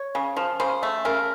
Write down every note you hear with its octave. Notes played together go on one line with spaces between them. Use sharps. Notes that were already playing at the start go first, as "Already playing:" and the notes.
Already playing: C#5
C#3
F3
C#3 C5
A3
C#3 A#4